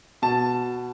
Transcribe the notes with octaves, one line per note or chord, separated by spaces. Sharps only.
B2 A5